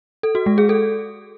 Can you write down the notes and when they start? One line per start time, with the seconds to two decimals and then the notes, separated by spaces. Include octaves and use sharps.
0.23 A4
0.35 F#4
0.46 G#3
0.58 G#4
0.69 A4